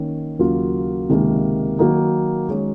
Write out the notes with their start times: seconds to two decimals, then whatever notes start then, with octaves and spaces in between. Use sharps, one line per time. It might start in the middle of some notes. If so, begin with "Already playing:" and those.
Already playing: D#3 A#3 C#4
0.39 D#2 C#3 F#3 A#3 F4
1.09 C#2 C3 D#3 A#3
1.78 D#3 F#3 A#3 D#4 F#4
2.49 D#3 G#3 C#4 F#4 C#5